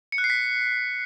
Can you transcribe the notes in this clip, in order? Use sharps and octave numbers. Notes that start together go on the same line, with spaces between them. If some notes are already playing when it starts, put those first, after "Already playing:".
C#7
F#6
C7
B6